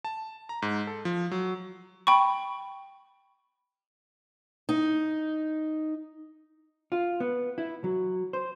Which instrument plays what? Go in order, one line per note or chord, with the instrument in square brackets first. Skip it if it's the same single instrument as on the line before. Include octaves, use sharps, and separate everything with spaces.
[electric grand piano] A5
A#5
G#2
A4
F3
F#3
[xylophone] G5 B5 C#6
[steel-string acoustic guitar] D#4
[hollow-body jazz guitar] F4
B3
E4
F#3
C5